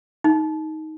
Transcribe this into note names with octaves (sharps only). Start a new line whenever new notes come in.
D#4